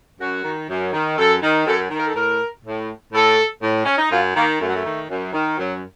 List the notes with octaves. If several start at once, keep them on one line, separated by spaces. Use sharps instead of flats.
F#2 F#4
D#3
F#2
D#3
F#2 A4
D#3
F#2 A4
D#3
A#4
A4
A2 A#4
A2
A2 A4
A2
C#4
D#4
F#2 F4
D#3 A#3
F#2 A3
F#3
A3
D#3
F#2
D#3
F#2 F#3